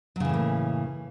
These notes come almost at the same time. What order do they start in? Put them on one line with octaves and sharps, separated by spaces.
F#3 C#3 E3 A2 A#3